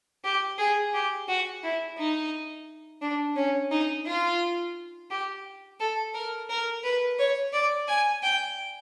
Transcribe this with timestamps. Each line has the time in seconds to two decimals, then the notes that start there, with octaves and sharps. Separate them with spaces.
0.24 G4
0.59 G#4
0.94 G4
1.28 F#4
1.63 E4
1.98 D#4
3.02 D4
3.36 C#4
3.71 D#4
4.06 F4
5.10 G4
5.80 A4
6.14 A#4
6.50 A#4
6.83 B4
7.19 C#5
7.53 D5
7.88 G#5
8.23 G5